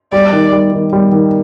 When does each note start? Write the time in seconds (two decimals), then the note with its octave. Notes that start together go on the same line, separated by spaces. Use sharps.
0.12 G3 D5
0.32 D#3
0.52 G3
0.72 D#3
0.93 G3
1.12 D#3